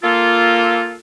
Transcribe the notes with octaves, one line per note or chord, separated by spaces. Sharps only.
A#3 F4 A4